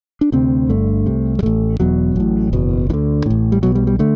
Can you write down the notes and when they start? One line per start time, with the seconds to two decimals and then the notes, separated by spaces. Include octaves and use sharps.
0.21 D4
0.32 D2 C3 C4
0.69 G1 G2 D3 A3
1.06 C2 C3
1.39 G3
1.43 A1 A2 A3
1.79 E1 E2 B2 F#3
2.16 A1 A2
2.53 F#1 E2 B2
2.90 D2 E3
2.93 D3
3.26 A1 A2
3.52 G3
3.63 B1 B2 F#3
3.75 G3
3.87 G3
3.99 D3 A3